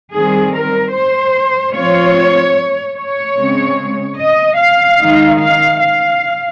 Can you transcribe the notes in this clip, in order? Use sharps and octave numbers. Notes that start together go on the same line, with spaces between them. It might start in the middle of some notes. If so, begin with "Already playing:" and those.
D#3 G3 C4 G#4
A#4
C5
F3 C4 F4 C#5
C#5
C#3 G#3 C4
D#5
F5
D#3 G#3 D#4
F5
F5